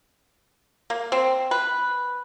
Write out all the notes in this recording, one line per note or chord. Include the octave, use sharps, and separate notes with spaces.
A#3
C4
B4